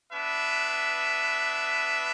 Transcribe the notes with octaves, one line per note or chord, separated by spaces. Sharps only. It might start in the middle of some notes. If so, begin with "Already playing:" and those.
B3 D4 B4 E5